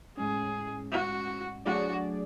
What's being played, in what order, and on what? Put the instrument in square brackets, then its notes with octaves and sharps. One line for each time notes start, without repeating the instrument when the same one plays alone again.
[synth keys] A2 G#3 C#4 [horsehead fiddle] G#4
[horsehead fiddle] F#4
[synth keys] F#3 A3 D4 G#4 D5 [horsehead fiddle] F#4